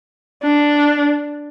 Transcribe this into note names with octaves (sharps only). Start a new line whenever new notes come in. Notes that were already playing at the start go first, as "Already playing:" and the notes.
D4